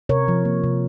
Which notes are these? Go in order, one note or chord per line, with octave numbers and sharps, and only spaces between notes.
C3 A#4 C#5
F3
A#3
C3